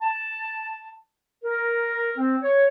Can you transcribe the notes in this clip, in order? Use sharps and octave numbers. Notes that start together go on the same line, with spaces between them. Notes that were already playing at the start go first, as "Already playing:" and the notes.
A5
A#4
C4
C#5